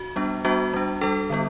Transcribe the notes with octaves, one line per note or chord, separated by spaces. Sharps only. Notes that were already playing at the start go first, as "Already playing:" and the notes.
Already playing: F#4
G3 B3 D4
G3 B3 D4 F#4
G3 D4
G3 D4 A4
D3 G3 B3